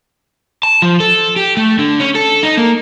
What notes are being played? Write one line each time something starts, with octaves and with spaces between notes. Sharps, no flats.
A5
F3
A4
G4
A3
D3
C#4
A4
D#4
A#3